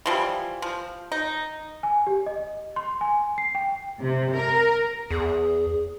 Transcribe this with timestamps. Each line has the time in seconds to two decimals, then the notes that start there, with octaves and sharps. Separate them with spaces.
0.06 E3 F3 G3
0.62 F3
1.12 D#4
1.83 G#5
2.07 G4
2.26 D#5
2.76 C6
3.01 G#5
3.38 C7
3.55 G5
4.02 C3
4.35 A#4
5.11 E2 G#4